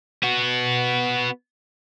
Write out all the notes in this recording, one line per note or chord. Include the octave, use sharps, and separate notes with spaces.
B3 F#4